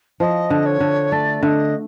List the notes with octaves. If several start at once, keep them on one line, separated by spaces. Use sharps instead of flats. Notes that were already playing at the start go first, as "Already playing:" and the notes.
F3 D#5
D3
C#5
D3
A3 D5
D3 D#5 E5